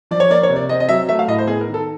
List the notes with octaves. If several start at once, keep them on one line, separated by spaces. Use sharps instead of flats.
F3 D5
C#5
A#3 D5
C#5
C3
D5
C4 D#5
D#5
F#3 E5
A3 E5
F5
A2 D#5
C5
B3 G#4
A#4
D#3
A4